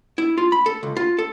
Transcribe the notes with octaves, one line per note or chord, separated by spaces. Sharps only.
E4
F4
B5
A4
C#2
F4
A4